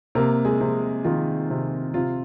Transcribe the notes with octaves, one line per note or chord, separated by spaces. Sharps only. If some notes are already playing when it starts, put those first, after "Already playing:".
C3 A#3 A#4
G#3 G#4
C3
D#3 F4
C3
C3 F4